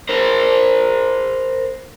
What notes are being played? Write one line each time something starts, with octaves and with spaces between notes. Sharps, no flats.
A#4 C5